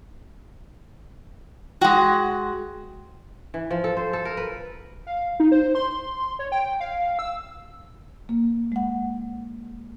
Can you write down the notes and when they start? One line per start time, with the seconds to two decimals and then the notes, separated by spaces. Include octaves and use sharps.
1.81 G#3 F#4 F#5 G5
3.54 E3
3.71 F3
3.84 A4
3.97 C5
4.13 A4
4.25 A#4
4.37 B4
5.07 F5
5.40 D#4
5.52 C5
5.75 C6
6.39 C#5
6.52 G5
6.80 F5
7.19 E6
8.29 A#3
8.72 G#3 F#5